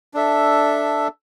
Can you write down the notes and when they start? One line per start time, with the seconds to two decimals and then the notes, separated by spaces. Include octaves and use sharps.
0.14 D4 A4 E5